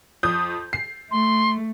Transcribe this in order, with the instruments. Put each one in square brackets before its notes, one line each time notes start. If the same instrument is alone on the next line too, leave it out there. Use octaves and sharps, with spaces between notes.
[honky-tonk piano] F2 D#6 G6
C7
[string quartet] A3 [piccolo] C6